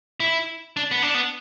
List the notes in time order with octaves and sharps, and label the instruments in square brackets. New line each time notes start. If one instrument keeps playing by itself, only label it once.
[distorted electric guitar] E4
D4
B3
D4
B3